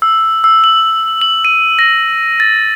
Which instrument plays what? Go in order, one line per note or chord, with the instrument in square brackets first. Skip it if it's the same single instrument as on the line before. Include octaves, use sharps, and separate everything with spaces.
[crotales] E6
E6
F#7
F#7
D#7
A#6
A6